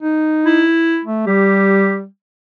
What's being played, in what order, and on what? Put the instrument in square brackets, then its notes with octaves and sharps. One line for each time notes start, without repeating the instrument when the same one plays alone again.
[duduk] D#4
[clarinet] E4
[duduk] A3
[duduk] G3 [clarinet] G4